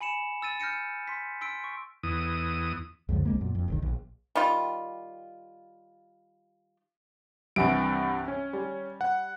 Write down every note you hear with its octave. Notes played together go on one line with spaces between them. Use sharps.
G#5 B5 C#7 E7
E6 A6 D#7
F6 G6 A#6 C#7 D#7
C6 B6
C6 E6 B6 D7
C#6
E2 D#6
C#2 F#2 D3 F3
C2 G#3 A#3
F#2 A#2
F2
E1 B1 D#3
A#1
D#3 G3 F4
C2 G2 C3 E3 F#5 D7
C#4
G3
F#5